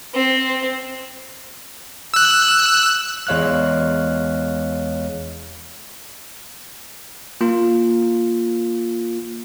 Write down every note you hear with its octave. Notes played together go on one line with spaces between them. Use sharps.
C4
E6 F#6
E2 G#3 C#5 F5 F6 F#6
A#3 F4